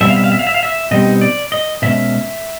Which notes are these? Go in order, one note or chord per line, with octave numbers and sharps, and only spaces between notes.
B2 G3 C4 E5
F5
E5
F5
E5
F5
E5
F5
E5
B2 G3 C4 D#4 D#5
D5
D#5
B2 G#3 C#4 E5